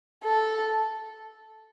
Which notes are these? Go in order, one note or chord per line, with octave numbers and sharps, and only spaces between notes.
A4